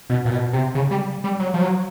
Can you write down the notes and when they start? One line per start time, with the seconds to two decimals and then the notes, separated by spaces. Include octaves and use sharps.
0.10 B2
0.25 A#2
0.31 B2
0.53 C3
0.75 C#3
0.91 G3
1.24 G3
1.40 F#3
1.54 F3
1.61 F#3